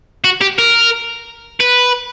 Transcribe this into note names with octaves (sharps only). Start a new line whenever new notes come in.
F#4
G4
A#4
B4